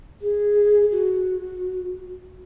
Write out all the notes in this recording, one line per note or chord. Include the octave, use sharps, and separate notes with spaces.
G#4
F#4